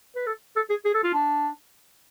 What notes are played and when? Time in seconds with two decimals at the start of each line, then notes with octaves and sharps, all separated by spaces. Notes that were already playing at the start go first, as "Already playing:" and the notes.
0.15 B4
0.27 A4
0.56 A4
0.70 G#4
0.85 G#4
0.94 A4
1.04 F4
1.14 D4